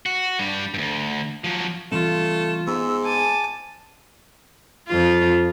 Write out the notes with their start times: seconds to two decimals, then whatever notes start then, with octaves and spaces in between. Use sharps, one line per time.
0.06 F#4
0.39 G2 G3
0.74 D2 G2
1.44 F3 F#3
1.92 E3 G3 A3 C4 F4 E7
2.67 G#2 B3 E6
3.04 G#5 A5 D6
4.88 F2 F4